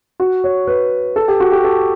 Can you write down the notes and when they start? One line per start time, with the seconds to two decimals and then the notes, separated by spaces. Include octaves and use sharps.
0.20 F#4
0.44 C#5
0.67 B4
1.16 A4
1.28 G4
1.40 F#4
1.52 G4
1.64 A4